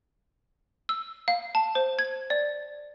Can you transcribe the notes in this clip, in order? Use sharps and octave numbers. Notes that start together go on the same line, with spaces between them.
E6
F5
A5
C5
G#6
D5